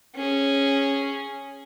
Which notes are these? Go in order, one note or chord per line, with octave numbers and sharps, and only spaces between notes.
C#4 G#4